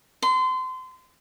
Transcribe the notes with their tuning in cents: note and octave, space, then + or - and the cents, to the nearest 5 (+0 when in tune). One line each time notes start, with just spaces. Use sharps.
C6 -30